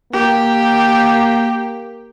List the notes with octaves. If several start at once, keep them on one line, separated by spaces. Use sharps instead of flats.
A#3 G4